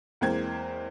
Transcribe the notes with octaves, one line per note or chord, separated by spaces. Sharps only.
E2 G#3 A#3 C4 G#6